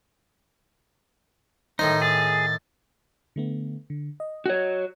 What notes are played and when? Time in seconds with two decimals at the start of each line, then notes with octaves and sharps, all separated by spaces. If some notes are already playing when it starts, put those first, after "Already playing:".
1.79 A2 D#3 D#4 C5
2.02 G#4 A6
3.36 D3 A3 B3
3.90 D3
4.20 D#5
4.46 F#4 C#5